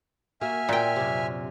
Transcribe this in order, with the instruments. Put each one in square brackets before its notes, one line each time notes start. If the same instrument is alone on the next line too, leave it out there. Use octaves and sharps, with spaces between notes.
[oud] A#3 F#4 [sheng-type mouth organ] E5 G#5 F6
[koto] A#2 G5
[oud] F#2 C3